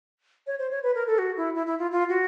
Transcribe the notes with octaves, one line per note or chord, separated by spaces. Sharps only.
C#5
C5
C#5
B4
A#4
A4
F#4
E4
E4
E4
F4
F4
F#4